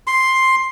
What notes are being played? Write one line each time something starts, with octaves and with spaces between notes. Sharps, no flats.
C6